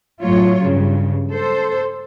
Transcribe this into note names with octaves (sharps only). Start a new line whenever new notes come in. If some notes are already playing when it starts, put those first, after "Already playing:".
F#2 A2 F#3 F4 C#5
G2 C#3
A4 C5